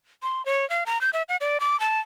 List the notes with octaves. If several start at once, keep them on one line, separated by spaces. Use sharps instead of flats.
C6
C#5
F5
A#5
G6
E5
F#5
D5
D6
A5